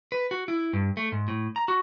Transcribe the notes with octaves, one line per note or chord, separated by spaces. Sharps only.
B4
F#4
E4
G2
A3
G#2
A2
A#5
F#4